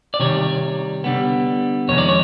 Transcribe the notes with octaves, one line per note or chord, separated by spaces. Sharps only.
D5
C3 D#3 G3 C#5
D3 G3 B3
F2 C3 D#3 G#3 C#5
D5
C#5